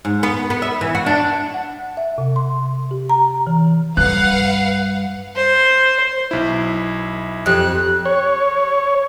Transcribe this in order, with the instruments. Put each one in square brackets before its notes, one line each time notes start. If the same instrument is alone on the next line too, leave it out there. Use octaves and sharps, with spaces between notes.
[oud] G#2
B3
B3
E5
E3
F#4
D4
[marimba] F#5
E5
C3
C6
G4
A#5
E3
[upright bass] G2 G3 [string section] B4 F5 F#5 [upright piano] F#6
[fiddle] C5
[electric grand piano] B1 E4
[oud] F2 [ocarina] G4 [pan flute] F#6
[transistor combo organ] C#5